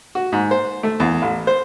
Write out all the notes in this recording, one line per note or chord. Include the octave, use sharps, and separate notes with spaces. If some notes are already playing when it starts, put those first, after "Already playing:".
F#4
G#2
C5
A3
E2
A1
C5